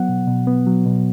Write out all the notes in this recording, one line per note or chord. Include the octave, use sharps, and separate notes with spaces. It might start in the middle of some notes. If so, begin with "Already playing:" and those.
Already playing: F#3 B3 F#5
B2
B2
B3
F#3
B2